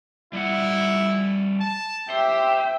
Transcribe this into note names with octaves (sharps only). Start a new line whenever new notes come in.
G3 A3 E4 F#5
A5
G4 C5 E5 G5